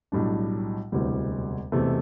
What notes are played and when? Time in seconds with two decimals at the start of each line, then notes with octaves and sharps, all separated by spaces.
0.12 B1 A2 G3 D4
0.92 E1 D2 C3 E3 G3
1.72 E1 E2 C3 E3 A3